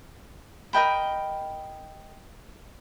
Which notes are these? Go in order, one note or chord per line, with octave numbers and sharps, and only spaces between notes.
A#4 D#5 G5 B5